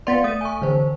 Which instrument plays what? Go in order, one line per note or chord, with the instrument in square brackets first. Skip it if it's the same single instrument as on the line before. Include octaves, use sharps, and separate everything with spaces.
[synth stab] B3 F4 [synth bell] D5 A6 B6
[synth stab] A3 [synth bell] D#6 D#7
[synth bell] G#5 C#6
D3 E3 C5